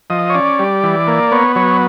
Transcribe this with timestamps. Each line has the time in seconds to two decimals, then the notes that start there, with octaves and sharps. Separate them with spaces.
0.10 F3 D#5
0.30 C#5
0.35 C#4 D5
0.59 G3
0.83 E3
1.07 A#3
1.31 B3 C#5
1.55 F#3 C#5